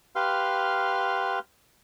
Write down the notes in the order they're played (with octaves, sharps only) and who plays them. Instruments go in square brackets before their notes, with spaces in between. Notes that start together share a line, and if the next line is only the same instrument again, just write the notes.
[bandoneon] G4 B4 F5 C6 F6